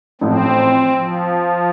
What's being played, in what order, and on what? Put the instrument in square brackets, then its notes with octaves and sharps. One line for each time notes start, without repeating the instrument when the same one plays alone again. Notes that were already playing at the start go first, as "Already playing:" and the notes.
[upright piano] A1 A2 F3 [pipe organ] C4
[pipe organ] F3